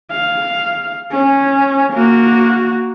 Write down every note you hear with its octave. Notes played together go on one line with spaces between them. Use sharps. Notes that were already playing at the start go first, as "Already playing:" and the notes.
F5
C#4
A#3 F#4